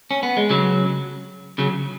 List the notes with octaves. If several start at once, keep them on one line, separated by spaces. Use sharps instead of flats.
C#4
B3
G#3
C#3 F#3
C#3 F#3